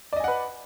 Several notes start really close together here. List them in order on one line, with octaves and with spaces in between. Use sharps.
D5 D#5 G#5 F#5 B4